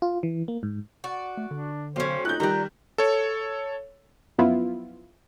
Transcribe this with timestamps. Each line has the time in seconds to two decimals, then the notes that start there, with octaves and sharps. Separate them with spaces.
0.02 F4
0.23 E3
0.48 A#3
0.63 G#2
1.04 F#4 D5
1.37 A3
1.51 D3 D4
1.96 B1 C#4 G4 C5
2.25 D#4 F4 F#6 G6
2.40 D#3 G3 D5 A#5
2.98 A4 C#5
4.38 F#2 F3 B3 E4 F4